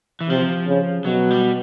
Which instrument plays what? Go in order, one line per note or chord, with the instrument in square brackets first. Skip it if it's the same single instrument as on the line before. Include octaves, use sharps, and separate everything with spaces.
[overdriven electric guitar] E3
[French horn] C3 [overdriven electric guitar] F3
[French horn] C#3
[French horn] B2 [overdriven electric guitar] F#3
[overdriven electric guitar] G3